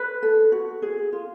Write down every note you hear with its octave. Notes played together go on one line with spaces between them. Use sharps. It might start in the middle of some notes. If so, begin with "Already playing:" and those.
Already playing: B4
A4
F#4
G#4
F4